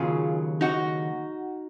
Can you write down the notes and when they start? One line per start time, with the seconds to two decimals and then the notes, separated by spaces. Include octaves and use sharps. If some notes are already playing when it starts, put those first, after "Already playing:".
Already playing: D#2 C#3 F#3 F4 G#4
0.61 D#4 F#4